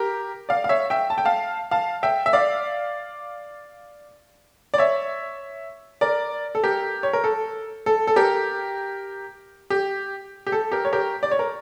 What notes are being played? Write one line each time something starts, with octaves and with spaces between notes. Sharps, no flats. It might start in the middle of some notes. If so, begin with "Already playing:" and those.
Already playing: G4 A#4
D5 F5
F5
C#5 E5
E5 G5
A5
G5
F5 A5
F5 A5
E5 G5
E5
D5 F5
D5
C#5 E5
A#4 D5
A4
G4 A#4
C#5
A#4
A4
A4
A4
G4 A#4
G4
G4
A4
G4 A#4
C#5
G4 A#4
D5
C#5
A#4